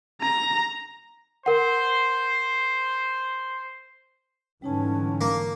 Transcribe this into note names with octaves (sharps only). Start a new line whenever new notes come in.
A#5
A#4 C5 F#5
G#2 D3 E3 G3 C#4 D#4 A5
A#3